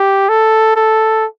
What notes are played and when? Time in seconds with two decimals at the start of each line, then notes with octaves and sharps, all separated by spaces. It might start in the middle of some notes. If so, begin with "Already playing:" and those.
Already playing: G4
0.29 A4
0.76 A4